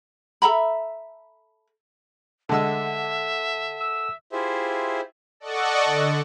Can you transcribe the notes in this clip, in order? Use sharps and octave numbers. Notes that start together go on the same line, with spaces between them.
A4 E5 A#5 B5
D3 G#3 A4 E5 F#5 A5 E6
E6
E4 F4 G4 G#4 C5 E5
A4 D5 D#5 F#5 C#6
D3